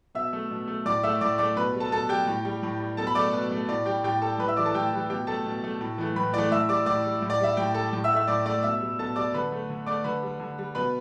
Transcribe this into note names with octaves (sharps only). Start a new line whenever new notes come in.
B2 E5 E6
A3
B2
A3
A2 D5 D6
A3 E5 E6
A2 D5 D6
A3 D5 D6
B2 B4 B5
G3
A4 A5
B2 A4 A5
G3 G4 G5
A2
G3
A2
G3
B2 A4 A5
B5
A3 D5 D6
B2 B4
A3
A2 D5
G3 G4 G5
A2 G4 G5
G3 A4 A5
A2 B4 B5
E5 E6
E3 G3 D5 D6
A4 A5
A2 G4 G5
E3 G3
B2 G4 G5
A3 A4 A5
B2
A3
A2
E3 A3
A2 B4 B5
E3 A3 D5 D6
A2 E5 E6
G3 D5 D6
A2 D5 D6
G3
A2
D5
G3 E5
A2 G4 G5
G3 A4 A5
A2
E5 E6
A3
E5 E6
A2 D5 D6
A3 D5 D6
B2 E5 E6
G3
B2 A4 A5
G3 D5 D6
D3 B4 B5
A3
D3
A3 D5 D6
D3 B4 B5
G3
D3
G3
B2 B4 B5